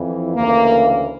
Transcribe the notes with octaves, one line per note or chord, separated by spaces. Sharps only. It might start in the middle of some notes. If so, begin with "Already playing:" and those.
Already playing: F2 E3
D2 C#3 E3 A#3